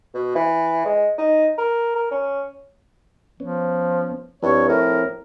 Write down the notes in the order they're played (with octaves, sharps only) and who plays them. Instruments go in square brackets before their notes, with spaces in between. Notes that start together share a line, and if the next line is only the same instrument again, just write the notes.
[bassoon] B2
E3
G#3
D#4
A#4
A#4
C#4
[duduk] F3 [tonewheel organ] B3 C#4
[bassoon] G2 [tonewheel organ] F3 C4 E4 [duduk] C#5
[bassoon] A2 [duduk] A#4